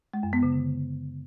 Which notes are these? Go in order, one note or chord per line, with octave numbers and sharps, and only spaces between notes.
G#3
F#2
B3
C#3
D3